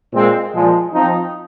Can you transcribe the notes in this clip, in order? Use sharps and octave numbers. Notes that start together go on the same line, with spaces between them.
A#2 G#3 C4
A#2 F3 G#3
F3 C4 D#4